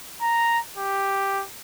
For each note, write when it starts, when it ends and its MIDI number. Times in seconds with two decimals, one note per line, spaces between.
0.22 0.59 82
0.77 1.43 67